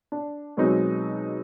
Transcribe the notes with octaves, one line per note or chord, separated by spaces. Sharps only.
D4
B2 F#3 G#3 C4 D#4